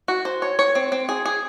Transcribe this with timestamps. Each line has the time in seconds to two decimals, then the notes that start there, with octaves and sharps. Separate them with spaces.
0.08 F#4
0.25 C5
0.42 C#5
0.59 C#5
0.75 C4
0.92 C4
1.09 G#4
1.26 G#4